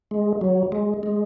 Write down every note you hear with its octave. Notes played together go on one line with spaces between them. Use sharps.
G#3
F#3
G#3
G#3